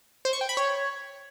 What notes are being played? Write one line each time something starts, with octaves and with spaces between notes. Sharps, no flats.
C5
C#6
G5
B5
C#5